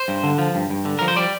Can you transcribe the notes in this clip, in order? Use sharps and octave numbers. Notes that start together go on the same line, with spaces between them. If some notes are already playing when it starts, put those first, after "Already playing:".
Already playing: C5
G2
D3
F3
G2
G2
D3
F3 A#4
C5
G3 D5